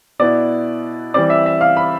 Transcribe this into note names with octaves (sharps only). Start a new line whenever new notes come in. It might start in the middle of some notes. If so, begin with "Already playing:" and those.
B2 B3 E4 D5
E3 G3 C4 D5
E5
E5
F5
B5